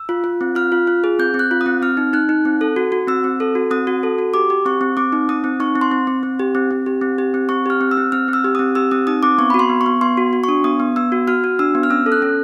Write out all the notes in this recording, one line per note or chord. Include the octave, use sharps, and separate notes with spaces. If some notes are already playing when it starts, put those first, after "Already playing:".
Already playing: E6
F4
F4
C4
F4 F6
F4
F4
G#4
C4 G6
C4
F#6
F4
D#6
C4
C4 F6
D#4
D#4 F#6
D#4
C4
A4
F#4
F#4
C4 E6
C4
A4
F#4
C4 D#6
F#4
A4
F#4
G4 D6
G4
C4 C#6
C4
C4 D6
D#4
C4 D#6
C4
D#4 C#6
C4
C6
C4
C4
C4
G4
C4
C4
G4
C4
G4
C4
C4 C#6
G4 F6
C4
E6
C4
C4 F6
C4
E6
G4
C4 D#6
G4 E6
C4 D#6
D#4 D#6
C4 D6
B3 C#6
F#4 B5
C6
B3
C#6
B3
B3 C6
F#4
F#4
D4 C#6
B3 D#6
B3
B3 E6
F#4
F#4 F6
F#4
D4 E6
B3
F6
C#4 E6
A4
F#6
C#4